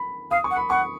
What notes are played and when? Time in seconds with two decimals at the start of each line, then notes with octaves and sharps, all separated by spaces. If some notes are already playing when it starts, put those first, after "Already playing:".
Already playing: B5
0.31 F5 D#6
0.44 C#6
0.51 F#5
0.56 B5
0.70 F#5 C#6